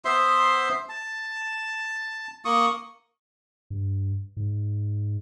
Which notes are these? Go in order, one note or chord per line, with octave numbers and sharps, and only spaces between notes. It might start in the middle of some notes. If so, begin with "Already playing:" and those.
B3 C5 E5 C6
A5
A#3 C#6 D#6
G2
G#2